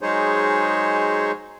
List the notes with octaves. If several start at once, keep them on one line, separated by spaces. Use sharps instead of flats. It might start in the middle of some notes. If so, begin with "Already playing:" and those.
F#3 G#3 D#4 G#4 C5 C#5